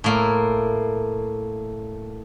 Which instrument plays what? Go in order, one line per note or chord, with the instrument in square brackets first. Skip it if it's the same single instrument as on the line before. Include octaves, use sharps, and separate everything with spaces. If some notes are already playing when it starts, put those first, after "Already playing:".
[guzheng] A2 A#3